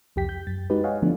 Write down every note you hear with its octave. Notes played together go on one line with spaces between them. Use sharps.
C2 F2 G4 G5 B6
G6
F#2 A6
G#3 D#4 F#4 G4 B4
C#5 D#5 F5 F#5 G#5
D3 F3 A3 B3 D4